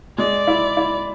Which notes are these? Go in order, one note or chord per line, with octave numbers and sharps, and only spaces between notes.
G#3 D5
E4
E4